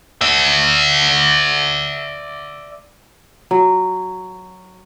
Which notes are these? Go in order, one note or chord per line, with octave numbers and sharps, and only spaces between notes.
D5 E5
F#3